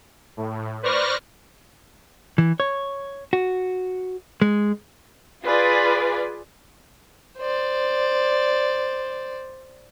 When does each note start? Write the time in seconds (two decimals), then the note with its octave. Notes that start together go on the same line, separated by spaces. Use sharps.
0.37 A2
0.83 B4 C5 D5 C#6 F6 A#6
2.38 E3
2.60 C#5
3.33 F#4
4.42 G#3
5.45 F4 G#4 B4 D5
7.39 C5 D5